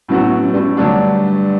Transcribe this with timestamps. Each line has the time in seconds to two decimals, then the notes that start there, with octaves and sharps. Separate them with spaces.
0.09 F#2 A2 F#3 B3 F#4
0.26 F#2
0.43 F#2
0.53 G2
0.61 F#2
0.77 G2 D3 F#3 A3 D4